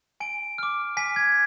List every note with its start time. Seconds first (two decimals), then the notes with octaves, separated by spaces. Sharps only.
0.20 G#5 D7
0.58 D6 F6
0.97 G#5 B6
1.16 G#6